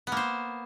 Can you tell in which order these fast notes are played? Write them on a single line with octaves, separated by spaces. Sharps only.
B3 A#3 C5